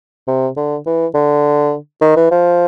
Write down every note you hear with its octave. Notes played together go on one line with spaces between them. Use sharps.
C3
D3
E3
D3
D#3
E3
F3